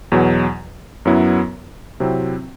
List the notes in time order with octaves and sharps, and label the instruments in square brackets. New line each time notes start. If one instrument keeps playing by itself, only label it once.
[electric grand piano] E2 B2 F#3
F#2 F#3 B3 E4
C3 F#3 C4 E4